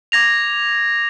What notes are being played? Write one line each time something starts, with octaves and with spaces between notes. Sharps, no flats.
D6 G#6 A#6 F7